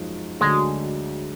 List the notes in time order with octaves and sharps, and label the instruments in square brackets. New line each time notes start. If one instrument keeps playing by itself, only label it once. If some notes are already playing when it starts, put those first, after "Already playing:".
Already playing: [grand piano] F#2 F3 G#3 D#4 F#4
[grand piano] D2 D3 F#3 [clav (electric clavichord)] G#3